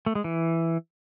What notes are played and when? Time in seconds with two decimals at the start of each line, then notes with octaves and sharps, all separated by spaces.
0.06 A3
0.15 G#3
0.24 E3